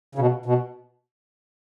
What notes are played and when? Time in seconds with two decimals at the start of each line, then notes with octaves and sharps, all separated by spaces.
0.15 C#3
0.19 B2
0.46 B2